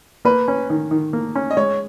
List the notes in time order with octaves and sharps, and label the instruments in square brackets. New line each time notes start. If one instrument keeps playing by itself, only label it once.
[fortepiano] A#3 [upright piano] B4
[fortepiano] C#4
D#3
D#3
A#3
C#4
[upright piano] D#5
[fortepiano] G#3 [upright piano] C#5